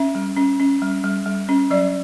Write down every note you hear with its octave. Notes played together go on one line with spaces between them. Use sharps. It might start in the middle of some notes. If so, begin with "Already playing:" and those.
Already playing: C#4 E5
G3
C#4
C#4
G3
G3
G3
C#4
F#3 D5